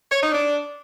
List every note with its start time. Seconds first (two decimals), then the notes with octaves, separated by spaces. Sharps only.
0.12 C#5
0.22 D#4
0.32 D4